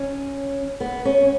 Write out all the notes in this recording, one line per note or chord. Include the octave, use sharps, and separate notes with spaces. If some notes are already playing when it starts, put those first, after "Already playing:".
Already playing: C#4
B3
C#4